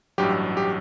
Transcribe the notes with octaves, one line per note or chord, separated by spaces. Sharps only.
A1 G2 F#3 G4
G4